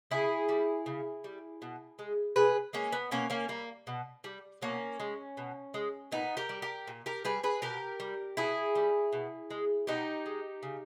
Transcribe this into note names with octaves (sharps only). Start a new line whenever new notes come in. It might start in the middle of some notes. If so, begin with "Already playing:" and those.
C#3 E4 G#4
G3
C#3
G3
B2
G#3
B2 G#4 B4
G#3 A#3 C#4
B3
B2 A#3 C#4
A#3 C#4
G3 A#3
B2
G3
B2 A#3 C#4
G#3
B2
G#3
A#2 B3 D#4
G4 A#4
G3
G4 A#4
A#2
G4 A#4
G3 G#4 B4
G#4 B4
B2 G4 A#4
G3
B2 E4 G#4
G3
B2
G#3
B2 D#4 G4
G#3
C#3